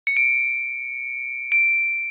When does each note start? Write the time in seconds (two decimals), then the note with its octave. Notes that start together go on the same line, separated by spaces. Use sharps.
0.07 C#7
0.17 D7
1.52 D7